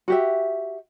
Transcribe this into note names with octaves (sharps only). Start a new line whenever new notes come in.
F#4 G4 E5